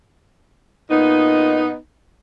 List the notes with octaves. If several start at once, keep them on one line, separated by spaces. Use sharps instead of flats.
A#2 B3 D#4